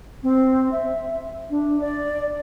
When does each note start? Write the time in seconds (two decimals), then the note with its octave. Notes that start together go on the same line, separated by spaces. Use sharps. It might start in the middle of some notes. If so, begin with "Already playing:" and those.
0.23 C4
0.72 E5
1.50 D4
1.80 D5